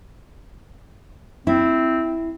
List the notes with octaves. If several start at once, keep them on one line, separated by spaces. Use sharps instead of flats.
C4 E4